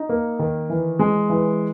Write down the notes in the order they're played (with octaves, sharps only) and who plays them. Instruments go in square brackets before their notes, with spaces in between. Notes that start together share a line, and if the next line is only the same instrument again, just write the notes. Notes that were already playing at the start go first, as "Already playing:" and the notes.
Already playing: [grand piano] D#4
A#3
D#3
E3
G#3
E3